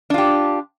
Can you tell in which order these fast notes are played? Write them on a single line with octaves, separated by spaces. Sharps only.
D4 F4 G4